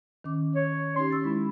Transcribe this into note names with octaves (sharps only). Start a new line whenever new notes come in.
D#3 C#4 D6
C#5
C#4 D#4 G4 C6
C#6 E6 A6
G#3 E4